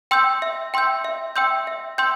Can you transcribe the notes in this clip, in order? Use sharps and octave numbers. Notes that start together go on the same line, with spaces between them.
G5 C6 E6 G6
E5
G5 C6 E6 G6
E5
G5 C6 E6 G6
E5
G5 C6 E6 G6